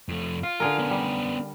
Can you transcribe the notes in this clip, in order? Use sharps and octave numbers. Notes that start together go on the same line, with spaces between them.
F2 A3
F4 F5
D3 G#4 A#4
B3 C#4
G3